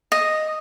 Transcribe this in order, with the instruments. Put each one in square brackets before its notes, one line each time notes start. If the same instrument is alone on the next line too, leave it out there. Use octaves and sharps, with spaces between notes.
[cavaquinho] D#5